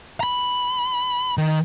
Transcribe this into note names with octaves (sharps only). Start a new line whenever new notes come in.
A#5 B5
D#3